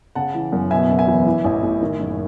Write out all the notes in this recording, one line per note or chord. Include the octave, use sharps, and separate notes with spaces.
C#3 F#5 A5
E3
F#2
B2 E5 G#5
F#1
E5 G#5
E2
E3
A1
A2
D#3
F#1